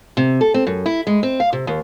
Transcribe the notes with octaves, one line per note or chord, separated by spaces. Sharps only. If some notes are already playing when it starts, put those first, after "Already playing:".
C3
A4
C4
F#2
E4
G#3
C4
F5
C3
D#2